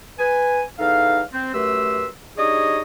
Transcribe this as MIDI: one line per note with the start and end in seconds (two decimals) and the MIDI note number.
0.19 0.63 71
0.19 0.63 80
0.79 1.21 40
0.79 1.21 63
0.79 1.21 69
0.79 1.21 77
1.32 1.51 60
1.53 2.07 42
1.53 2.07 57
1.53 2.07 67
1.53 2.07 71
1.53 2.07 84
1.53 2.07 88
2.37 2.81 62
2.37 2.81 63
2.37 2.81 67
2.37 2.81 68
2.37 2.81 73
2.37 2.81 75